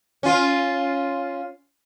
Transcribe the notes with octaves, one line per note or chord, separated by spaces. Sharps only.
C#4 F4